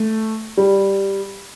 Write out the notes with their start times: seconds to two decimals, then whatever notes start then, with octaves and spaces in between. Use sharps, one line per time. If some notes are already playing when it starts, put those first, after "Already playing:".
Already playing: A3
0.57 G3